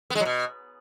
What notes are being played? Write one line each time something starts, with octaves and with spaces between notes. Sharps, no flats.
B3
G#3
F#3
B2